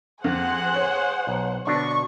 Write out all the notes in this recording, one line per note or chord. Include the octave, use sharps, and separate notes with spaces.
F2 G#4 C5 F#5
C#5
B1
B2 D3 D4 C#6